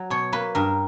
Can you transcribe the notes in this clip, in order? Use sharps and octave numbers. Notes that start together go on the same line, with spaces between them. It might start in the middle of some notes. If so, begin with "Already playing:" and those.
Already playing: F#3
B2 C#5
A#3 B4
G2 A#4